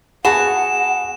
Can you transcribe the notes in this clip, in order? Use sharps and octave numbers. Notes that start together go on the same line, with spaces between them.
B3 F#4 G#4 F#5 A5 E7